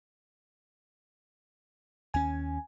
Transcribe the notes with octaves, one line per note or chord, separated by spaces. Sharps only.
D#2 C#4 G#5